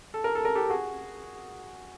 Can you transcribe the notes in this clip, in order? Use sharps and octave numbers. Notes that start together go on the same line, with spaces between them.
A4
A#4
A4
A#4
G4 A4
F#4 G#4